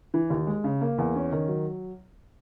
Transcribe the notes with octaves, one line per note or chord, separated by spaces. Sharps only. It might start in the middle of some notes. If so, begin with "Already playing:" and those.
E3
D#2
G#3
C#3
A#3
E2
C#4
D#3
F#3